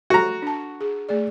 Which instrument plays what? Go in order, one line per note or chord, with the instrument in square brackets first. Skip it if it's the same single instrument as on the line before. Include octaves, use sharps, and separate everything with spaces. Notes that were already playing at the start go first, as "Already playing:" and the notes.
[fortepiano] F#4 A#5 [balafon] A4
[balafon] D4 A5
G#4
A3 G#4 D5